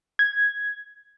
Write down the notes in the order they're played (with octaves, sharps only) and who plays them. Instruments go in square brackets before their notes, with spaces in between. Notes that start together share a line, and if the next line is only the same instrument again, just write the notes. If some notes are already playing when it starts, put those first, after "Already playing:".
[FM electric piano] G#6